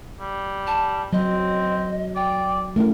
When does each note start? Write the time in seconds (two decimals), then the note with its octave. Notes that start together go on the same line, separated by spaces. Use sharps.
0.20 G3
0.67 A5
1.13 F#3 C4 D#5
2.16 D5 G5
2.76 A3 C#4 E4 A#4